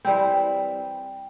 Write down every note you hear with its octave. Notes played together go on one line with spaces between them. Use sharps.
E3 G3 C4 G5